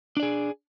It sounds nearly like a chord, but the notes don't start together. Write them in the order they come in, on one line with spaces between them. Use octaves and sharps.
D4 D5 G#4